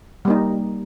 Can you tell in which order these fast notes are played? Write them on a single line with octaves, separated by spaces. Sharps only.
G3 A#3 D#4